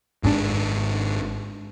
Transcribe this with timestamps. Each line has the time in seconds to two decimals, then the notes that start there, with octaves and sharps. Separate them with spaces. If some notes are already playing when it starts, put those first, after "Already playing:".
0.23 G#1 G#2 C#3 D4